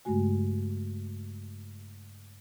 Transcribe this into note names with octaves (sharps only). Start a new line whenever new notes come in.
G2 C#3 G#3 A3 F#4 G#5